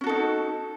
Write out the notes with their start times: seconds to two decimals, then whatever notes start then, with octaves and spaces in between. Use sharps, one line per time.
0.01 C#4
0.04 F#4
0.07 A4
0.09 D#4